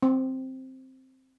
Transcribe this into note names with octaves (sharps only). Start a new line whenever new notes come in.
C4